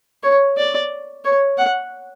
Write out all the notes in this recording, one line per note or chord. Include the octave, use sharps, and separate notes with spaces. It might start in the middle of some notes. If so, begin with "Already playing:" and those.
C#5
D5
C#5
F#5